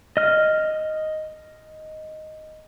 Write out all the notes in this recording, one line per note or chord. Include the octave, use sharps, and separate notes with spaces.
D#5 F6